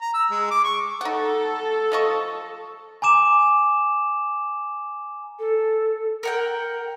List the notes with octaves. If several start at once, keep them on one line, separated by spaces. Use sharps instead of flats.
A#5
E6
G#3
D6
C#6
D#4 A4 F#5
F3 D#5 C#6
G#5 A#5 D6 E7
A4
A#4 F#5 G5